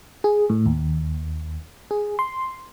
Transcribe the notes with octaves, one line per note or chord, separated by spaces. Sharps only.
G#4
A2
D#2
G#4
C6